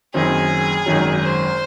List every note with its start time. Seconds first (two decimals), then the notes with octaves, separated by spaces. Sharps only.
0.14 F#1 F#2 D#3 F#3 C4 G#4
0.86 G#1 F#2 D#3 F#3
1.22 C5